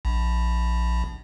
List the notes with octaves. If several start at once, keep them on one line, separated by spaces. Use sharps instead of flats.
A#1